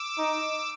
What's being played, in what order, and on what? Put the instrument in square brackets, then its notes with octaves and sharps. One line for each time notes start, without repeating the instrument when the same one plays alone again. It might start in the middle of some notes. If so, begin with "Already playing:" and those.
Already playing: [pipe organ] D6 E6
[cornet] D#4